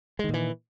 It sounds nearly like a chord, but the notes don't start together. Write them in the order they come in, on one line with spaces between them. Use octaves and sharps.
G#3 D#3 A#2 E3